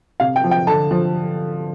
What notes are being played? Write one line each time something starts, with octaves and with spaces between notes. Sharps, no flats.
C3 F5
G5
F3
G5
D3 A5
F3